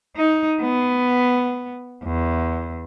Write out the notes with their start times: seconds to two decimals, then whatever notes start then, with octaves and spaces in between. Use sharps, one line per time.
0.17 D#4
0.62 B3
2.04 E2